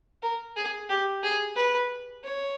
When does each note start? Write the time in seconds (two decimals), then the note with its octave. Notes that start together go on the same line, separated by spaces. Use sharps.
0.23 A#4
0.56 G#4
0.89 G4
1.23 G#4
1.56 B4
2.24 C#5